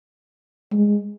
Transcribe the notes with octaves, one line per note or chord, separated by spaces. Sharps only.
G#3